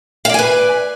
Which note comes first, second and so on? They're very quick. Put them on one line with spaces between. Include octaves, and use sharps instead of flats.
F5 D5 G#5 B4